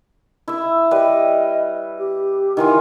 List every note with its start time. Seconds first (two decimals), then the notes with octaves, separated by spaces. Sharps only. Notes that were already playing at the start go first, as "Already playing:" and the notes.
0.48 E4 E5
0.91 G3 B4 D#5
1.98 G4
2.57 D#3 E3 E4 F4